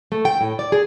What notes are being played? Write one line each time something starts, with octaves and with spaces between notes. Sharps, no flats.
A3
G5
A2
D5
G#4